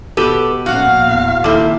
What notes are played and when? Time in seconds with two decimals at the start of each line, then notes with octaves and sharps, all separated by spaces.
0.17 B2 G4 A4 B4 D#7
0.66 A#1 A#2 C#4 F#4 F5 F#5
1.05 E2
1.44 D#2 F3 C4 E4 A4 D6